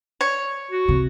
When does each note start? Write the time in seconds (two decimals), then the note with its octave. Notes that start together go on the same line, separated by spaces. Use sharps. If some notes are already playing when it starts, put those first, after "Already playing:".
0.21 C#5
0.71 F#4
0.88 C3